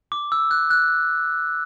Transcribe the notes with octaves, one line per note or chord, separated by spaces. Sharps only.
D6
E6
F#6
F#6